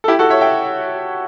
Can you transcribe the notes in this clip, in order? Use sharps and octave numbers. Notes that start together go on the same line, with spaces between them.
A4
E4 G4
F#4 A4
C#5 E5
E5 G5